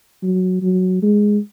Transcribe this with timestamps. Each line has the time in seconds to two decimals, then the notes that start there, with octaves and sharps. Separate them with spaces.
0.23 F#3
0.62 F#3
1.03 G#3